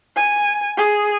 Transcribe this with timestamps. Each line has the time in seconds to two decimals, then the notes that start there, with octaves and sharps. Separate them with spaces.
0.16 G#5
0.77 G#4